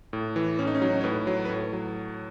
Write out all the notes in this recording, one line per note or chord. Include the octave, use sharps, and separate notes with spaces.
A2
E3
A2 C#4
D#4
C#4
F#3 D#4
C#4
C#5
A2 B4
F#3
B4
A2 C#5
F#3